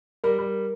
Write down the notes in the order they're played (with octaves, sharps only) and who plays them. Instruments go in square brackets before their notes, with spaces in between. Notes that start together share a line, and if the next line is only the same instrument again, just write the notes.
[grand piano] G3 [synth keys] A#4
[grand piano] G3